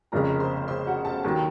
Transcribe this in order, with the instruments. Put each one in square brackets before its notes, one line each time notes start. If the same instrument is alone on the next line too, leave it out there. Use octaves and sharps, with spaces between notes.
[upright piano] F1 F2 C#3 [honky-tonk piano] A#4 A#5
[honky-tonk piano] C5 C6
C5 C6
F#4 F#5
A4 A5
[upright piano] D#2 D#3 F#3 [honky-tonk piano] A4 A5